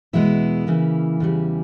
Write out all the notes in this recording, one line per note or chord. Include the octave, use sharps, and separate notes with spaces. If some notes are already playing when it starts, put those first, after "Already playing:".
E2 B2 G#3 B3 E4
C#3 E3 A#3
E2 C#3 G3